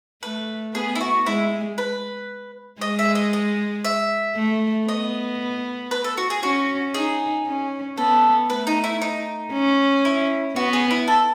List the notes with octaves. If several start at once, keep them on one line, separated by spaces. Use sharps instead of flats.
A3 B4
B3 G#4
E4
F#4
G#3 E4
B4
G#3 D#5
E5
D#5
D#5
E5
A3
B3 D#5
B4
A4
F#4
G#4
C#4 F#4
D#4 G#4
C#4
B3 A4
A3 B4
D#4
E4
D#4
C#4
E4
B3 F#4
G#4
E4
A4